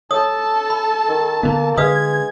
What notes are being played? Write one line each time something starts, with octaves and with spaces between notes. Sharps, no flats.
A4 C#5 A5 D#6
B5
D#3
D3 A#3 B3
D3 G#3 B4 F5 D#6 G#6